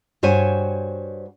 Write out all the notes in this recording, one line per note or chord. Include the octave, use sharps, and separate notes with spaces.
G2 F#4 C5 C#5 G#5